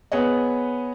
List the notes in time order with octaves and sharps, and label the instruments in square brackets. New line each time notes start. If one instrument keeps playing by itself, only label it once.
[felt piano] B3 G#4 B4 C#5 D#5